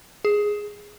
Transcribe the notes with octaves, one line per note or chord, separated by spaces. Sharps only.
G#4